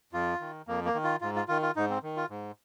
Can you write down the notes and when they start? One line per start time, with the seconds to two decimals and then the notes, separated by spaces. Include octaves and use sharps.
0.13 F2 F4
0.40 D#3
0.67 F2 A#3
0.85 A#3
0.94 D#3
1.04 F4
1.21 G#2 F4
1.36 F4
1.48 D#3 F4
1.62 F4
1.76 G#2 D#4
1.89 C4
2.03 D#3
2.17 F4
2.30 G#2